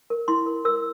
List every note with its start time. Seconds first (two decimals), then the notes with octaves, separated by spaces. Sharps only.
0.10 A#4
0.28 E4 C6
0.46 A#4
0.65 A#4 E6